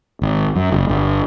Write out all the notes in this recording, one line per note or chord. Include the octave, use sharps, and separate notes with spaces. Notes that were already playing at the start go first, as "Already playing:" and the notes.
G#1
F#2
F#1
G1